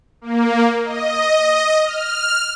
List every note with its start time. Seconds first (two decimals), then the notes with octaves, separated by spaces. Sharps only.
0.21 A#3
0.83 D#5
1.84 F6